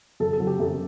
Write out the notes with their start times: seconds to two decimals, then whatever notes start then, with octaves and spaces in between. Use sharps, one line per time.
0.20 F#2 A4
0.33 A4
0.40 F#3
0.47 G4
0.60 F#2 A4